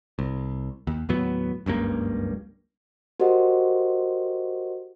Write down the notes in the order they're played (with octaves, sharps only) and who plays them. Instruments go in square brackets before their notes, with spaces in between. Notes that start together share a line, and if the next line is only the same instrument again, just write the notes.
[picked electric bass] C2
D#2
D#2 A2 F#3 B3
F#1 C#2 G2 A#3
[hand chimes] F#4 G4 A#4 C5 D#5 F#5